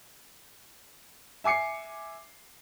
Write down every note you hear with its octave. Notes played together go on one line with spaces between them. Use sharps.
E5 G#5 D6 C7 C#7